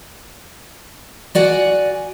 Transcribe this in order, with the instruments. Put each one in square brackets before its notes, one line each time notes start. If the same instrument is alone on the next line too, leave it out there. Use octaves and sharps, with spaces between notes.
[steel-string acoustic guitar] F#4 D5 F#5 G#5